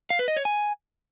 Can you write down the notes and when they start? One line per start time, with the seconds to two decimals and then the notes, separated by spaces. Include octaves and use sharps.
0.10 F5
0.19 B4
0.28 D#5
0.37 C#5
0.45 G#5